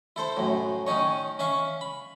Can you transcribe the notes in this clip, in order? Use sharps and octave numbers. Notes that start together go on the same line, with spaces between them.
E4 A4 C5
F#2 A2
D#3 C#4 D#4 C#5
C#4 E5 F5 C#6
B5